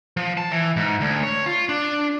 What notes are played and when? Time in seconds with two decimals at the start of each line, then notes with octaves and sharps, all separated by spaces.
0.17 F3
0.37 A5
0.52 E3
0.76 G#2
1.01 D2
1.23 C#5
1.46 F4
1.69 D4